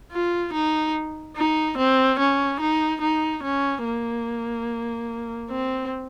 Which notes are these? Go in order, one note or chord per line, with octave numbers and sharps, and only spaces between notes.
F4
D#4
D#4
C4
C#4
D#4
D#4
C#4
A#3
C4